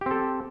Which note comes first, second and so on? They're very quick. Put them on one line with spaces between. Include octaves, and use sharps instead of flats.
G4 C4 A4